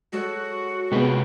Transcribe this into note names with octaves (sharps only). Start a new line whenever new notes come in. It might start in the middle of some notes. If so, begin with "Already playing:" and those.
G#3 F#4 A4 C#5
C3 G#3 B3 F4 B4 F#5 G5